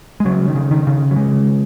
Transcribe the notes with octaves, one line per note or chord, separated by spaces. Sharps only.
G#3
C#3 F#3
D#3
C#3
D#3
C#3
F#3
C#3 G#3